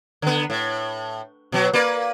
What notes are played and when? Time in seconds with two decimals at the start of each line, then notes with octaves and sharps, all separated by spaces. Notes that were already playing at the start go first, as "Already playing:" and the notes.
0.22 D3 B3
0.50 A2
1.52 B2 F#3
1.73 A#3 B4 D5